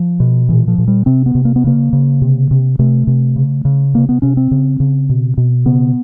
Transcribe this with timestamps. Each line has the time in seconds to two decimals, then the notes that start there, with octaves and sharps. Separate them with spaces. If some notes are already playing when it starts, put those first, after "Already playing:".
Already playing: F3
0.20 B2
0.49 A#2 E3
0.68 F3
0.78 A#2
0.88 G3
1.06 C3 C4
1.26 B3
1.35 C3
1.45 A#3
1.56 B3
1.64 C#3 A#3
1.93 C#3
2.22 C3
2.51 C3
2.79 C3 A3
3.07 C3
3.36 C#3
3.65 C#3
3.94 C3 A#3
4.09 B3
4.22 C3 C#4
4.37 C4
4.51 C#3
4.80 C#3
5.09 B2
5.37 B2
5.65 C#3 B3